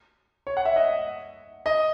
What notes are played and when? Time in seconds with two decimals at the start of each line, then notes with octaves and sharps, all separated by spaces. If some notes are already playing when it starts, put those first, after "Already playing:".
0.47 C#5
0.57 F#5
0.65 E5
0.76 D#5
1.66 D#5